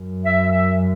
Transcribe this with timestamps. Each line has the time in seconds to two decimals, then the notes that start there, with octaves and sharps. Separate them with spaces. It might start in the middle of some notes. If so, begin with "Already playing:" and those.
Already playing: F#2
0.25 E5
0.51 E5